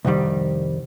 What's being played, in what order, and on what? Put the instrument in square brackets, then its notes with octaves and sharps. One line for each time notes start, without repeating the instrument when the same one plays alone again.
[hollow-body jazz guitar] C2 F2 D#3 G3